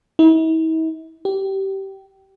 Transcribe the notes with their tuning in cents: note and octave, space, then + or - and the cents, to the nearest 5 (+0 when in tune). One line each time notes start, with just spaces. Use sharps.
E4 -45
G4 -20